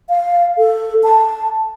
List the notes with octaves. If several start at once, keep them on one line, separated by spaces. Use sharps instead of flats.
F5
A4
A5